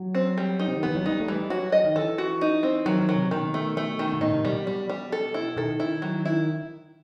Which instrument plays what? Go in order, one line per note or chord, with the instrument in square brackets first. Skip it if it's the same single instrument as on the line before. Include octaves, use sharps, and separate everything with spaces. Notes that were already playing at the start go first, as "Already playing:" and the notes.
Already playing: [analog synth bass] F#3
[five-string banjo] C4
G3
D#4
[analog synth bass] C3
D#3
[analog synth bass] E3 [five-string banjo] B3
[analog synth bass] F#3
[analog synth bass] G3 [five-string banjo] D#4
[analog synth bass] A3
[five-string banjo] E3 [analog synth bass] G3
[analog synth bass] F#3 [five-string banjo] F#4
[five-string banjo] D#5
[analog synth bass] D#3
[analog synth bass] E3 [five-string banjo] A4
[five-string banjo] F#4
D#4
C4
[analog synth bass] D#3 [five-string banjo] F#3
[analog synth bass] D#3
[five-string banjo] F#3
[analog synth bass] C3
[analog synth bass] B2 [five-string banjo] D#3
[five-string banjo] A3
A3
D#3
[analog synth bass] B2
[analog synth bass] A2 [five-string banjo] D#4
[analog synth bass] C3
[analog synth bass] B2 [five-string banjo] G3
[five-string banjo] G3
G3
A4
E4
[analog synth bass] D#3 [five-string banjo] A4
[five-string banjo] E4
F#3
E4